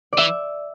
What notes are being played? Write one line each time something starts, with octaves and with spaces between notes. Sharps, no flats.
D5
E3 E5